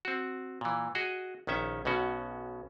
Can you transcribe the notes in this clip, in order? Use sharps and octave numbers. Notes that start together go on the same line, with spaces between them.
C4 F#4
A#2 E3
F#4 G#4 D#5
A#1 D#3 C#4 E5
B1 B2 C#4 F#4